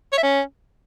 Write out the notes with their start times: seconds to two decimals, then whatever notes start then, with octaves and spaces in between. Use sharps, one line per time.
0.13 C#5
0.18 E5
0.23 C#4